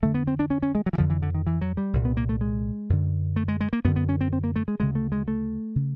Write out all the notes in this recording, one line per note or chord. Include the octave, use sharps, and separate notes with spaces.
F2 D3 A3
B3
C4
D4
C#4
C#4
G#3
F#3
E3
F2 D3 F3
E3
D3
D#3
E3
F#3
G3
C2 A#2
B3
A#3
A3
G#3
F#2 D3
A3
G#3
G#3
A#3
F#2 D3 B3
B3
C#4
C4
C4
A#3
A3
G#3
D2 C#3 G#3
A3
G#3
A3
C#3